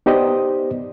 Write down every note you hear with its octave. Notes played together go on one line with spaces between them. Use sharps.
B3 D#4 G4 C5 D5 D#5